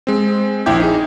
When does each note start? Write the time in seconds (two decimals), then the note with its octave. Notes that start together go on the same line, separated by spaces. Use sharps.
0.07 G#3 C4
0.66 A#1 D#2 E4 G5 D6 G6
0.80 D#4 G#4